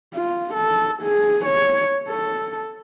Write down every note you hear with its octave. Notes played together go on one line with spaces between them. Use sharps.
F4
A4
G#4
C#5
A4